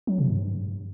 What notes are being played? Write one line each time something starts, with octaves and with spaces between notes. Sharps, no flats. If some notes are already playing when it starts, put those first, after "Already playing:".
F#3
C3
G2